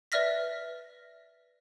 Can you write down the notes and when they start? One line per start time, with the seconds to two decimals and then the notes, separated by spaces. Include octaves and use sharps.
0.12 B4 D5 E5 F6 A#6 B6